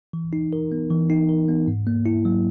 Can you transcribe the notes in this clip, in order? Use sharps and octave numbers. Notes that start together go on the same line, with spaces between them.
E3
D#4
A#4
B3
E3
D#4
A#4
B3
G#2
A#3
E4
F#3